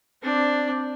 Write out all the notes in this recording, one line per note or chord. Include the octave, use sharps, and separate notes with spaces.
C4 D4